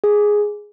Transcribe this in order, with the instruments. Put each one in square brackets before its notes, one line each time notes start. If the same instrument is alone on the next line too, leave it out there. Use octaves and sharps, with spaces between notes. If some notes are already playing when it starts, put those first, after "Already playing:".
[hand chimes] G#4